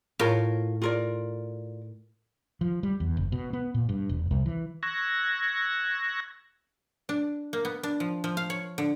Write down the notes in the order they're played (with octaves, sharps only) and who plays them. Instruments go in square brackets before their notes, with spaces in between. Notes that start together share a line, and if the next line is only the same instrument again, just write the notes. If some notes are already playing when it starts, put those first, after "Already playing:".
[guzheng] A2 [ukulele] F4 A#4
[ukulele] F4 A#4 D5
[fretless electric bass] F3
G3
E2
F#1
B2
B3
A#2
G2
E1
C2
E3
[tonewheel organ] C#6 E6 F#6 G#6 A#6
[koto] D4
A#3
B3
D4
F3
F3
F5
C#5
D3